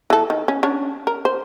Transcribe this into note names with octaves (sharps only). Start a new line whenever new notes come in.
E3 A4
D#3
C#4
C#4 D4 C#5
A#4
C5